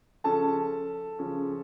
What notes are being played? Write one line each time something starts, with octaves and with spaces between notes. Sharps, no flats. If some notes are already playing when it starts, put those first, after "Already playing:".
C#3 F3 C#4 A4 A5
C#3 F3 C#4